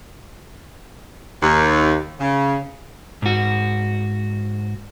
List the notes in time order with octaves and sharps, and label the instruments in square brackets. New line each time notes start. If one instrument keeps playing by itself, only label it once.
[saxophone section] D#2
C#3
[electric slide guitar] G#2 F#4